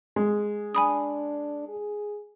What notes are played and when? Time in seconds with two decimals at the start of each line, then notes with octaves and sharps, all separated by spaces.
0.16 G#3
0.75 D4 G#5 B5 D#6
1.68 G#4